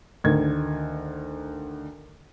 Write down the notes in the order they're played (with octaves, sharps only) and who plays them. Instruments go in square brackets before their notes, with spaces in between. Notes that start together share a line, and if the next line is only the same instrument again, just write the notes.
[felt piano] D2 D#3 G#6